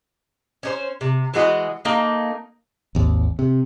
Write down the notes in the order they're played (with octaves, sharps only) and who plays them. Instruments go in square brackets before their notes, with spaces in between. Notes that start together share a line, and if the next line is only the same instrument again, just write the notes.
[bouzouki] C#4 D4 C5
C3
E3 G#3 F#4 D#5
A3 A#3 D#4
[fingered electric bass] G#1 D#2
C3